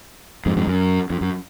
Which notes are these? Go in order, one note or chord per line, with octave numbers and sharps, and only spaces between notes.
F2 G#2
F2 G#2
F#2
F2
F#2